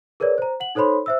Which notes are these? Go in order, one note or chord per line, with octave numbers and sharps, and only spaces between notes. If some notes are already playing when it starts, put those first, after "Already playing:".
G#4 A#4 B4 C#5 D5
C5 A#5
F#5 F#7
D#4 A4 C5 C#5 B5 C6
C5 E5 E6